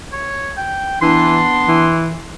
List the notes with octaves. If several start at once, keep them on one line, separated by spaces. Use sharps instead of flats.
C#5
G5
E3 B3 D4 C6
E3